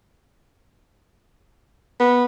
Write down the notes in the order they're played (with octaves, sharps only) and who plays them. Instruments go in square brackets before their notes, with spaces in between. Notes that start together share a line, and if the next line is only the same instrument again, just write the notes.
[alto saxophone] B3